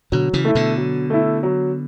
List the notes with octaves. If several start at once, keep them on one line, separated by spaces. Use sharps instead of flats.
B2 D3 F#3
C#3 E3
A3 E4
B2 D3
F#3
A3 E4
F#3